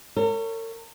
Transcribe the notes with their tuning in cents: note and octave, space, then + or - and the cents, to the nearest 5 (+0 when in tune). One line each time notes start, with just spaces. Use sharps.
A#4 -45 C#5 +0